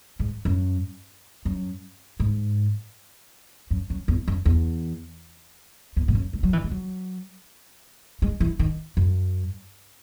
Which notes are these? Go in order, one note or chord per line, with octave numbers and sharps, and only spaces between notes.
G#2
F#2
F#2
G#2
F#2
F#2
E2
F#2
E2
E2
G#2
F#2
G#2
F#3
E3
G#3
F#3
G#3
E3
D#3
F#2